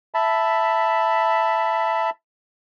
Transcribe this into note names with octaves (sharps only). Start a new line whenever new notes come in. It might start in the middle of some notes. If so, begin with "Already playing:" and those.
E5 A5 B5